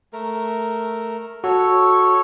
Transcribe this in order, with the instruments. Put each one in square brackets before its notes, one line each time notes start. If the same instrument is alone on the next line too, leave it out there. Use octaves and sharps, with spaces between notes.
[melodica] A3 A#4
[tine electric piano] F#4 [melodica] A4 C#5